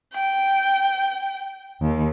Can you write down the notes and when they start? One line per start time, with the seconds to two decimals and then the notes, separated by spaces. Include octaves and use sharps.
0.13 G5
1.81 D#2